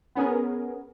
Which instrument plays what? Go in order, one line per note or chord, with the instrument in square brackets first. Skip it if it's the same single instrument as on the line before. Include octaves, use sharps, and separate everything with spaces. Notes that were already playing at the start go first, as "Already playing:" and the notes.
[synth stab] B3 C#4 G#4 A#4